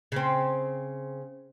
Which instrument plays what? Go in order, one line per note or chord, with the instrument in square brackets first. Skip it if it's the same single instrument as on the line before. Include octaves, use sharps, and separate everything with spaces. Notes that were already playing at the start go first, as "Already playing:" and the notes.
[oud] C#3 C4